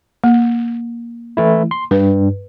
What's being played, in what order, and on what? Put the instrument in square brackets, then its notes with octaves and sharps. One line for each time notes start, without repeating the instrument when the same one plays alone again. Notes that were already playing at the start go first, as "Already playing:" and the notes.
[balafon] A#3
[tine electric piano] E3 A3 E4
C6
[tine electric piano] G2 [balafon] B4